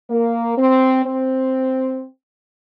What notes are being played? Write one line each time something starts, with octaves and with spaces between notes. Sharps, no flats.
A#3
C4
C4